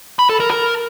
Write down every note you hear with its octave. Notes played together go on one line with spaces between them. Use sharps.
B5
A4
A#4
A#4